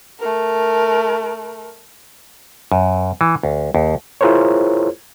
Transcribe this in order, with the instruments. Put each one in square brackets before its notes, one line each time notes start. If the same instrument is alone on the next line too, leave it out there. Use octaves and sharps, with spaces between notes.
[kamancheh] A3 A#4
[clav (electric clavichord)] F#2
E3
D2
D#2
[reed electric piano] E4 F4 G#4 A#4 C5 C#5